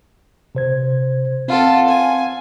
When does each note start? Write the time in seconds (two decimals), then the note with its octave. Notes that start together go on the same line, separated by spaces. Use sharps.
0.55 C3 C5 G#6
1.48 C4 F4 A4 F5 F#5
1.88 G#5